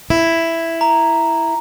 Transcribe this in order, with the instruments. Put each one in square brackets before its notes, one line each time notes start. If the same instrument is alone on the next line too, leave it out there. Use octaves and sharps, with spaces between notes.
[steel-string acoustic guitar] E4
[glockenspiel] A#5